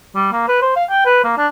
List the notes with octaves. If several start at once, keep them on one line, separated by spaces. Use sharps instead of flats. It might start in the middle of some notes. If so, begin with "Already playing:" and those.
G3
A#3
B4
C5
F5
G5
B4
A#3
D4